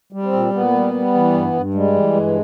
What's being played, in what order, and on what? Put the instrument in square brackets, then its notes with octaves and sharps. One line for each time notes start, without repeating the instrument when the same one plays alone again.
[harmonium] G3
C4
A#2
A#2 B3
G3
G3
E3
G2
G2
G3 G#3
E3
G2